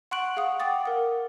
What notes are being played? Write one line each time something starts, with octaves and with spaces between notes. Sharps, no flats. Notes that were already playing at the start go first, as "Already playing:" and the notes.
F#5 C6 C#6 F#6 D7 F#7
G#4 F5 F#5 D#6
F#5 G5 D6 D#6 A6
A#4 F#5